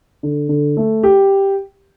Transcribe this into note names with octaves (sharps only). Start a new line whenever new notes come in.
D3
D3
A3
G4